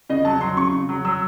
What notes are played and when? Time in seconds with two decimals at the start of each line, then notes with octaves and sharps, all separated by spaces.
0.10 C#3 D#5
0.25 F#3 A5
0.41 F#3 C6
0.57 C#3 C#6
0.73 C#3
0.89 F#3
1.05 F#3 E6